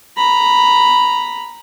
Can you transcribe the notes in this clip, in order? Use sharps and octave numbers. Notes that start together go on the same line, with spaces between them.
A#5 B5